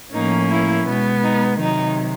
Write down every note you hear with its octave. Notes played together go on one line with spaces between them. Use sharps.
A2 F3 A#3 C#4 D#4
E4
B2 G#3 B3
D#4
C3 D#3 F#3 D#4